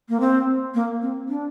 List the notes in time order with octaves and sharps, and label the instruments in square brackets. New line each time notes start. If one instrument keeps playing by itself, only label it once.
[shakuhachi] A#3
C4
A#3
C4
D4